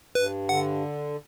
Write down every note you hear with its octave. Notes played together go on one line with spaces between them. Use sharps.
G2 B4
D3 F#5